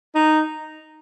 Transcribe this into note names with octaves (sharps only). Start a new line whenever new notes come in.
D#4